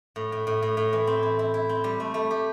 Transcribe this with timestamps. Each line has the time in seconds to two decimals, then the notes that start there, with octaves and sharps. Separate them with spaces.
0.16 A2
0.32 A2
0.47 A2
0.62 A2
0.77 A2
0.93 E3
1.07 C4
1.23 E4
1.39 E4
1.54 E4
1.69 C4
1.84 G3
2.00 A3
2.14 A3
2.31 G4